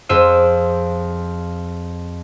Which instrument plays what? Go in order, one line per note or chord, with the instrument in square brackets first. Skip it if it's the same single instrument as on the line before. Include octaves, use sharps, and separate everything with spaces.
[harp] F2 G#4 C5 E6 D#7